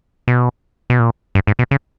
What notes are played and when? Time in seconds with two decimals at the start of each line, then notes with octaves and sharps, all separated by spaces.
0.28 B2
0.90 B2
1.00 A#2
1.35 G2
1.47 G#2
1.59 B2
1.71 C#3